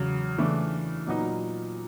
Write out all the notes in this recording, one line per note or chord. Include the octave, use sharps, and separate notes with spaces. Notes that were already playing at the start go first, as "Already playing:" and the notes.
Already playing: E2 C#3 F#3
C#3 E3 A3 D4
A#2 F#3 B3 D#4